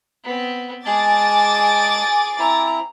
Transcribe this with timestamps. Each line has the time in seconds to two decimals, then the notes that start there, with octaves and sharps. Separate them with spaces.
0.24 B3 C4
0.86 G#3 G#4 G#5 A5 D6 A6
2.39 C4 E4 A#5